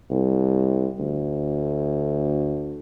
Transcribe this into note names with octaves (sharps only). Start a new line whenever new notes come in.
C2
D2